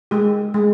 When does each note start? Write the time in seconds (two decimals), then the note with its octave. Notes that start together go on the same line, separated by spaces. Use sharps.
0.11 G#3 G4
0.54 G#3